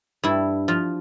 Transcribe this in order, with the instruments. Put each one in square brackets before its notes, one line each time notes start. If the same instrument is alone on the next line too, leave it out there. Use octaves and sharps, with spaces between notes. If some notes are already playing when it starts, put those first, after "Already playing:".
[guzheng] G2 E4
F3 F4